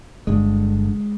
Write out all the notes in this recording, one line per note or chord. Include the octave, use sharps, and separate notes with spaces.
G1 G2 D3 G#3